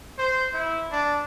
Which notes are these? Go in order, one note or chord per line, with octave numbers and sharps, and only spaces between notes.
C5
E4
D4